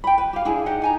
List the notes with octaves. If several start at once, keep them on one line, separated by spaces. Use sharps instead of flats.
G5 B5
B4
G4 F5
D4 E4 G#4 G#5
D#4 G4 D#5 F#5
D#4 G#5 A#5